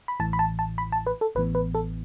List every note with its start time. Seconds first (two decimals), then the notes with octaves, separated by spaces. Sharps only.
0.08 B5
0.20 A1 A2 E3 A5
0.33 B5
0.39 A5
0.59 A5
0.78 B5
0.92 A5
1.07 B4
1.21 A4
1.35 A1 A2 E3 B3 B4
1.55 B4
1.75 A4